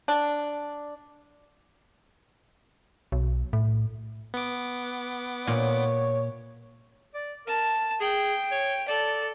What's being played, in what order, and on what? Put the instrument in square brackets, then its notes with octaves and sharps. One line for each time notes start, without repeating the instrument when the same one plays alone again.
[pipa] D4
[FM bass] B1
A2
[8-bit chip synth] B3 D6
[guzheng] A#2 [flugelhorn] C#5
[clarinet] D5
[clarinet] A#4 [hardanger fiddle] A5
[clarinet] G#4 [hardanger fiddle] G5
[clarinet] C#5
[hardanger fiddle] A4 [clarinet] D5